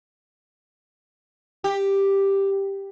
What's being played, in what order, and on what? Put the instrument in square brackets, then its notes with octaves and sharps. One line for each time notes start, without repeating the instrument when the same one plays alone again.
[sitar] G4